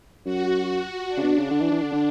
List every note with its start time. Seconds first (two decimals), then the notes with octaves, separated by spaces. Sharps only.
0.25 F#2 F#4
1.08 D4
1.17 C#3
1.23 B2
1.36 C#3
1.51 D3
1.61 E3
1.71 E3
1.82 D3
1.92 D3